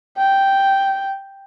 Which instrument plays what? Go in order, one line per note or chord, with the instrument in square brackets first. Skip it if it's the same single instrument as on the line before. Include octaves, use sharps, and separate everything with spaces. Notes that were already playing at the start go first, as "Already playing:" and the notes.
[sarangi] G5